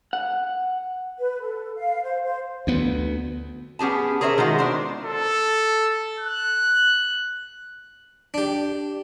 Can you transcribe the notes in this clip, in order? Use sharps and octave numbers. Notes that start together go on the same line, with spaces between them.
F#5
B4
A4
F5
C5
C5
D2 B3
B3 C#4 G4 G#4 A5
G#4 A#4 C5 C#5 E5
D#3 G#3 F4 F#4
B3 D4 C5
A4
F#6
D4 G4